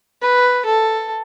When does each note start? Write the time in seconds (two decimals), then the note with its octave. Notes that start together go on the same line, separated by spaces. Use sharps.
0.22 B4
0.65 A4